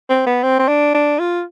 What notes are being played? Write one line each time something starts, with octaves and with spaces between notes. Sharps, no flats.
C4
B3
C4
C4
D4
D4
F4